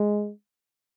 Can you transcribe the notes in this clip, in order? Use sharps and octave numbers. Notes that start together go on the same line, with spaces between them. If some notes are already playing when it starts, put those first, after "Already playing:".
Already playing: G#3